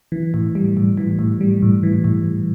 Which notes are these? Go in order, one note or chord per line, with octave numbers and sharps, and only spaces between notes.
E3
A2
G3
A2
E3
A2
G3
A2
E3
A2